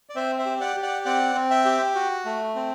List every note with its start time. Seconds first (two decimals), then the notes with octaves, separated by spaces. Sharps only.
0.09 D5
0.16 C4 C5 E5
0.38 C5 E5
0.45 G4
0.61 D5 F#5
0.76 G4
0.83 D5 F#5
1.05 C4 D5 F#5
1.35 C4
1.50 E5 G5
1.65 G4
1.95 F#4
2.25 A3
2.55 C4